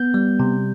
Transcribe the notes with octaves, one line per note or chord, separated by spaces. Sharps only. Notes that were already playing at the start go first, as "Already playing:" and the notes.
Already playing: B3 G6
G3
C3